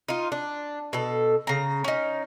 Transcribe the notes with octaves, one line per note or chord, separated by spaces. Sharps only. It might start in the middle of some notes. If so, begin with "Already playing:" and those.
D#4 F4
D4
B2 A4
C#3 A#5
C#4 D#4